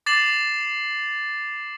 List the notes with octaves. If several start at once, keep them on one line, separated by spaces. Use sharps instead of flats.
D6 A6 C7 E7 F#7